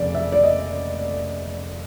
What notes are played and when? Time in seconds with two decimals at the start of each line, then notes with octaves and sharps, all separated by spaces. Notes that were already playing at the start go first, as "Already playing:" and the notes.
Already playing: F1 F2 C#3 D5
0.15 E5
0.32 D5
0.43 D#5